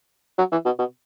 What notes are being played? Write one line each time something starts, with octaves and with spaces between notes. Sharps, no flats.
F#3
E3
B2
B2